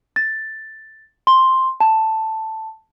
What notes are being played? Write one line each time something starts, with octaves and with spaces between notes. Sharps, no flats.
A6
C6
A5